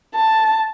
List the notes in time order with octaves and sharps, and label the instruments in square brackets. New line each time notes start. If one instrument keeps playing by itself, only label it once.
[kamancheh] A5